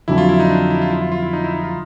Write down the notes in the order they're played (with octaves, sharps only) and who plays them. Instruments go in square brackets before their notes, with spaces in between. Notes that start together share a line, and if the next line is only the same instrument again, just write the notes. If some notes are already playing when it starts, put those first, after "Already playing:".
[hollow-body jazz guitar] F2 D3 F#3 [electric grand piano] E4
[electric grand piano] F4
E4
D#4
D4
E4
E4
F4
E4
F4
F4
E4
D#4
E4
D#4
F4